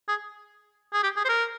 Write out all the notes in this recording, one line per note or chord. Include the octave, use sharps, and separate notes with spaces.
G#4
G#4
G4
G#4
C5
A#4